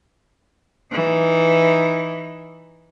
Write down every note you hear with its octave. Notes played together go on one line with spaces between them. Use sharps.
E3 D#4